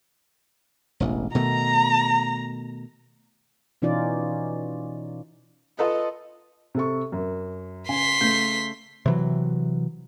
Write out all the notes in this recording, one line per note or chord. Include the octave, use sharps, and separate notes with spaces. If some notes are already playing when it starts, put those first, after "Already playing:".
E1 A1
B2 D#3 A3 A#5
B2 E3 C#4 D#4 F4 D5
F4 A4 B4 D#5
C3 A4 C#6
F#2
C#3 G#5 C6 B6
C#3 A3 G6
C3 E3 F#3